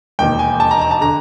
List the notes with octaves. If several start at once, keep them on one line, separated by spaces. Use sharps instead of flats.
E1 D#2 D#3 G5
G#5
A5
A#5
A#5
A5
D3 A#5